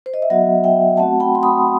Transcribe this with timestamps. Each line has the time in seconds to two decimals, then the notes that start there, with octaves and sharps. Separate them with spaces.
0.06 C5
0.14 D#5
0.22 E5
0.30 F#3 B3 F#4 D#5 F#5
0.64 E5 G5
0.97 A3 C4 F#4 F#5 A5
1.20 G5 B5
1.35 C6
1.43 B5 D#6